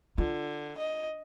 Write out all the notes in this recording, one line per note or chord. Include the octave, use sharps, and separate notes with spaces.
D3 F4
D#5